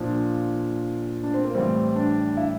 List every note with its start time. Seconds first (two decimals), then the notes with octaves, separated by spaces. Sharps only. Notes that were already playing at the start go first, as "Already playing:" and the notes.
Already playing: A#2 F3 D4
1.23 D4
1.34 C4
1.44 A#3
1.54 A2 E3 G3 C4
1.96 D4
2.37 E4